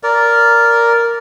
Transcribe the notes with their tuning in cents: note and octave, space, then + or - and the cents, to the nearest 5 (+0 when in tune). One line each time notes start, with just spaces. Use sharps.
A#4 +0 D5 -15